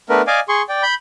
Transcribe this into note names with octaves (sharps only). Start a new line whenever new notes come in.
A3 B3 D4 A#4 B4
D5 D#5 F5 G#5 D6
G#4 C6 C#6
D5 G5
B5 G6